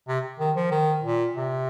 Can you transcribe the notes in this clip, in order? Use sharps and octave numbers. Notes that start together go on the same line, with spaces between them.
C3
D#3
F3
D#3
A#2
C3